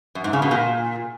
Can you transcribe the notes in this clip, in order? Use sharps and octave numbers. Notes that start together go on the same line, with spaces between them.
F#2
G#2
C#3
B2
A#2